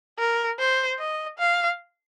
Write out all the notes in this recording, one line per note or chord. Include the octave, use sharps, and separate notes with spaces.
A#4
C5
D#5
F5